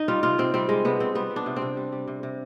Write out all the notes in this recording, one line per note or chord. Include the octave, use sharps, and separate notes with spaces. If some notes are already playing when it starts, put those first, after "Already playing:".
Already playing: D#4
G3 F4
C3 F4
C3 C4
G3 C4
G3 G#3
C3 B3
C3 C4
G3 B3
G3
D4
C3
C4
C3
G3
G3
C3
C3